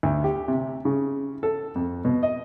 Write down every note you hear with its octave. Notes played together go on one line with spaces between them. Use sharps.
D2
G4
C3
C#3
A4
F2
B2
D#5